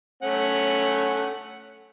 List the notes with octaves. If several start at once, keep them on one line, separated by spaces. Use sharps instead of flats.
A3 C#4 F#5